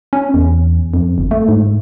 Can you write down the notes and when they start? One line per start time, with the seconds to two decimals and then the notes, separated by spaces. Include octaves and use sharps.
0.13 C#4
0.34 E2
0.94 F2
1.18 G1
1.31 A3
1.48 G#2